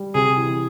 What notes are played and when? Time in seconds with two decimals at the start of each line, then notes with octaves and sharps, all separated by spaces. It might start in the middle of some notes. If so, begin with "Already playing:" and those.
Already playing: G3
0.15 C3 G#4
0.36 E3